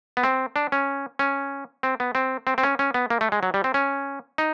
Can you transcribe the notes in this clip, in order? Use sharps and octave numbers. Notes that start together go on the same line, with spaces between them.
B3
C4
D4
C#4
C#4
C4
B3
C4
C4
C4
C#4
C#4
B3
A#3
A3
G#3
F#3
G3
C4
C#4
D#4